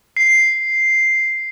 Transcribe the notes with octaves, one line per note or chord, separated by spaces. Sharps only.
C7